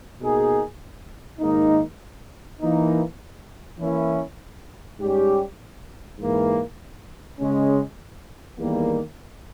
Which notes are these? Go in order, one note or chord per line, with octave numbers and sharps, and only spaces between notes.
B2 A#3 D#4 G#4
G#2 D#3 A#3 D#4
E3 A#3 D#4
E3 A#3 C#4 E4
G#2 G3 C#4 G4
G#2 E3 A#3
C#3 G#3 C#4
E2 D#3 G3 A#3